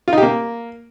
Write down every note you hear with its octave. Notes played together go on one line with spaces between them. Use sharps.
F4
D#4
G4
A#3